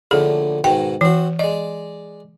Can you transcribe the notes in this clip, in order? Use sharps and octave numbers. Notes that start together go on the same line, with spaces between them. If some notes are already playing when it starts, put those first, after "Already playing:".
A#1 A2 D3 G#4
G#2 B2 D#3 G5
E3 C4 F#4
G#3 D5 D#5